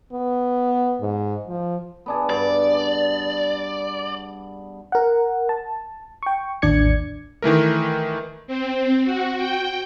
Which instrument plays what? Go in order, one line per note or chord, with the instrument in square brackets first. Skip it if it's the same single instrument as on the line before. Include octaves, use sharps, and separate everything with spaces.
[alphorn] B3
G#2
F3
[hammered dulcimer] B3 D4 G#4
[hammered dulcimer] G2 [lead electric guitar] D5
[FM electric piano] A#4 F#5
A5
G5 C#6
A1 D#2 D4 D5 G#6 C#7
[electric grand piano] D#3 E3 A3 A#4
[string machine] C4
F#4
G5